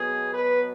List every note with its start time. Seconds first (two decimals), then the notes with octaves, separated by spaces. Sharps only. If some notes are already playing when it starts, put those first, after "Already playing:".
Already playing: B2 F#3 B3 G#4
0.32 B4